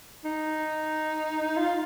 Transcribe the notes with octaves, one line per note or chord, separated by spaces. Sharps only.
D#4
F4